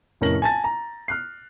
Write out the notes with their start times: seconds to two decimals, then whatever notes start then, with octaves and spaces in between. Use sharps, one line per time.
0.21 F1 A2 C#4 A#4 A#6 F#7
0.42 G#5 A5 A6
0.64 A#5
1.08 F6 F#6 C7